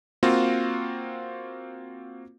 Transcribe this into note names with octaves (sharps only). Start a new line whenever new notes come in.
A#3 C4 F4 F#4